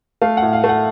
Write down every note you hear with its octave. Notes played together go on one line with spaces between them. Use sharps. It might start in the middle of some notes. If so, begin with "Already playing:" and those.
A3 F5
F#5
A2
F5
A3
F#5